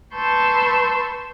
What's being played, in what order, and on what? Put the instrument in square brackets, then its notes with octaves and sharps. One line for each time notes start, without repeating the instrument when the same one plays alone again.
[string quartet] B4 A5 C6 C#6 E6 G6